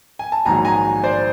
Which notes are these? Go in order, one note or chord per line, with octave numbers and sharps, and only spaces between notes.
G#5
A5
A#1 G#2 D#3 F#3 G#5 A#5
G#5 A#5
C5 D5